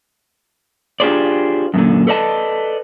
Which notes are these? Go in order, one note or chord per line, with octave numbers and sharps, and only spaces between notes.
D4 F4 G4 G#4 C5 D5
F#2 A#2 D3
A4 B4 D5 D#5 A5